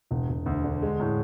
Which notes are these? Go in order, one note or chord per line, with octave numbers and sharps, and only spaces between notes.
E1
E1
D2
D3
G#3
A2